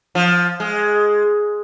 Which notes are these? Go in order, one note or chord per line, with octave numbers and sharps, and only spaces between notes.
F3
G#3